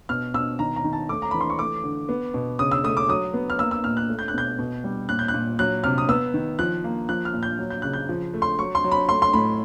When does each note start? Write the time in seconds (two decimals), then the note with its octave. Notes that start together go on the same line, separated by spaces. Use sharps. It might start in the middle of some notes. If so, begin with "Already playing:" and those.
0.09 B2 F6
0.34 B2 E6
0.59 D#3 A#5
0.76 A#5
0.84 D#3
0.93 A5
1.09 A3 D6
1.22 A#5
1.31 E3 B5
1.41 C6
1.50 C#6
1.59 A3 D6
1.84 D3
2.09 B3
2.34 B2
2.59 C#3 D#6
2.71 E6
2.84 A3 D#6
2.97 D6
3.09 F#3 D#6
3.34 B3
3.50 F6
3.59 A#3 E6
3.71 E6
3.84 A#2 F6
3.97 F#6
4.09 A3
4.19 G6
4.28 F#6
4.34 B2 G6
4.59 B2
4.84 G3
5.09 A#2 F#6
5.19 G6
5.28 F#6
5.34 A#2
5.59 F#3 F#6
5.84 C3 F6
5.98 D#6
6.09 B3 E6
6.34 D#3
6.59 F3 F#6
6.84 A#3
7.09 F3 F#6
7.25 F6
7.34 A#2
7.43 G6
7.59 F#3
7.70 G6
7.82 C#3 F#6
7.93 G6
8.09 F3
8.34 A3
8.42 C6
8.59 F#3 C#6
8.75 C6
8.84 F#3
8.91 B5
9.09 A3 C6
9.22 C6
9.33 A2 B5